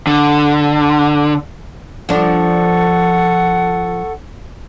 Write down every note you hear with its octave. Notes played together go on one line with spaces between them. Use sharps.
D3
F3 D4 A4 F#5 C#6